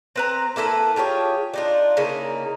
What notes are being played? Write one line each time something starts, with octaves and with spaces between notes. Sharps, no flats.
C4 B4 A#5
A#3 E4 A4 B4
F4 G4 G#4 C#5
D4 D#4 F4
C#3 A#3 D#4 E4